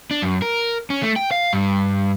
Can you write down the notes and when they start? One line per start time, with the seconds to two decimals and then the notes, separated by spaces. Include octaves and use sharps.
0.11 D4
0.22 F#2
0.42 A#4
0.90 C#4
1.03 A3
1.16 G5
1.31 F5
1.53 G2